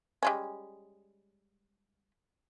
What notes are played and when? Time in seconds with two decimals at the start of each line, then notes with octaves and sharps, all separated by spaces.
0.23 G3 G#3 C#4